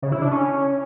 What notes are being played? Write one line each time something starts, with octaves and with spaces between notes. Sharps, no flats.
C#3
E4
D4
C#4